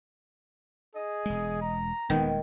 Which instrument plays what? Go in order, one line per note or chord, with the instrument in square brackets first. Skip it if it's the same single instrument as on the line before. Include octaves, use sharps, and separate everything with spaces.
[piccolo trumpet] G#4 [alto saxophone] D#5
[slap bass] E1 G#3
[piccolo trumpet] A#5
[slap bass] D#1 E2 G#3 [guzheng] D#3 [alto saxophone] B3